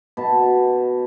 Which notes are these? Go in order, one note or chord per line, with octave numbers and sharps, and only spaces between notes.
B2 A5